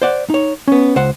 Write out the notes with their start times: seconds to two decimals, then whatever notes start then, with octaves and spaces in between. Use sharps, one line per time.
0.02 C5 D5 F#5
0.30 D#4 C#5
0.68 B3 C#4
0.96 C#2 C5 F#5